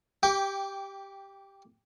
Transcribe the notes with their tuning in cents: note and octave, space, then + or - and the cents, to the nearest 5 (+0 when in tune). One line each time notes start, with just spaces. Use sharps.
G4 +0 G5 +10 D6 -25